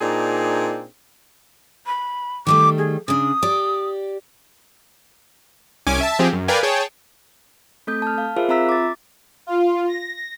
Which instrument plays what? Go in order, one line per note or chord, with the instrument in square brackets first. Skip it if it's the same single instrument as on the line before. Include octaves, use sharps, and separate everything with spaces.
[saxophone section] A#2 C4 D4 D#4 G#4
[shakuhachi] B5
[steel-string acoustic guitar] D#3 G3 A3 [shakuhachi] D6
[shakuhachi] G#4
[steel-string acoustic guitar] C#3 D4 [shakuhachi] D#6
[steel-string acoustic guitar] G4 D5
[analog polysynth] C2 C#4 G#5 D6
E5 A5
F3 C4 G4 G#4
F#2
A#4 B4 D5 F5 G5 G#5
G#4 C#5 G5 A5
[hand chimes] A3 C4 A4 D#6 G6
A5 F6
F5
F4 G#4 A#4 C5 E5 F5
C4 F4 E5 A#5 E6 B6
D6 A6
[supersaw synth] F4
A#6